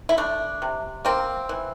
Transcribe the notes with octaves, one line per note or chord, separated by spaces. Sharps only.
E4
A3 D4
C3
A#3 C4
E3